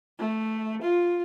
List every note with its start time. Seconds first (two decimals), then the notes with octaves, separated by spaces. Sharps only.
0.19 A3
0.81 F4